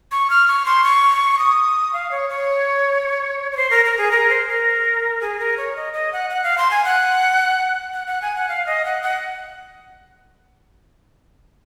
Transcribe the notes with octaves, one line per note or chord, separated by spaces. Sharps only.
C#6
F6
C#6
C6
C#6
D#6
F5
C#5
C#5
C#5
C5
A#4
A#4
G#4
A#4
C5
A#4
G#4
A#4
C#5
D#5
D#5
F#5
F#5
F5
C6
G#5
F#5
F#5
F#5
G#5
F#5
F5
D#5
F#5
F#5